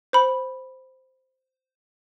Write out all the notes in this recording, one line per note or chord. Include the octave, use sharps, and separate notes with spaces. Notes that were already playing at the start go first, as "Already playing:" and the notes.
C5 B5